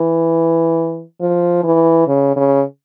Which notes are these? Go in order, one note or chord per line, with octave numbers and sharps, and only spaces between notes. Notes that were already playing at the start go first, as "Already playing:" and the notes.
Already playing: E3
F3
E3
C#3
C#3